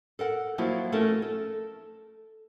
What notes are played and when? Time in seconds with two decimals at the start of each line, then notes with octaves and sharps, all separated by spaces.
0.19 A4 A#4 F#5
0.58 F3 F#3 A#3 E4 F#4
0.92 A3 C#4 D#4 A4 A#4
1.22 A4